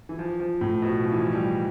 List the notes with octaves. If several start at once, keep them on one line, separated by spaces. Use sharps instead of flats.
E3
F3
F3
A2
B2
F3
E3
F3
G3